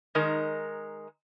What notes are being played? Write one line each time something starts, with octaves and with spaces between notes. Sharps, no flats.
D#3 G#3 D#4 A#4